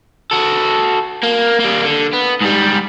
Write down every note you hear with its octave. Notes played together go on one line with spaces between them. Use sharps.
F#4 A4
A#3
G3 A#3
D3
B3
G#2 G3